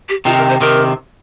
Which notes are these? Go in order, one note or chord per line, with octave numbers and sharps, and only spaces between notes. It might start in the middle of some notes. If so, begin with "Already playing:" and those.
G4
C3 D#3 F4
A#4
C5
C3 D#3 A#4